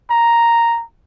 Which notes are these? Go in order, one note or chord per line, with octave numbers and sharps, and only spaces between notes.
A#5